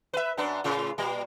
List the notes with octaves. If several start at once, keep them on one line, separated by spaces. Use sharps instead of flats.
B4 E5
F#2 B3 D4
A2 C#3 F4
A#2 G3